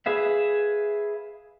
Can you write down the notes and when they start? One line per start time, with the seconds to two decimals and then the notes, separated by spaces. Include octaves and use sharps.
0.06 G#4 B4 E5 F5